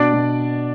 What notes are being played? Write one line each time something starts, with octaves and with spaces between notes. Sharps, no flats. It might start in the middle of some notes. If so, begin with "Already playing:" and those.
Already playing: B2 D4 D5
B2